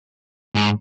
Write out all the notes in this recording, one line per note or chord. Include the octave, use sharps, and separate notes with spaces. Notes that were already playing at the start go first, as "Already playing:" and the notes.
G#2